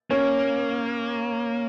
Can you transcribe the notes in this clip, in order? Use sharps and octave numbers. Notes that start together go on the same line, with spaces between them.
A#3 C#4